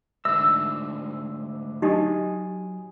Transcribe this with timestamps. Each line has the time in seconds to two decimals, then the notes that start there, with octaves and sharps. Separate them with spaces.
0.25 D2 G#2 D3 E5 E6
1.82 F#3 D#4 G4 D#5 G#5 D#6